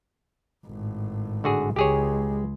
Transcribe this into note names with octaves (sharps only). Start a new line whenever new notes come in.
G#1 A2
D3 F#4 G#4
C#2 G#3 G4 G#4 C#5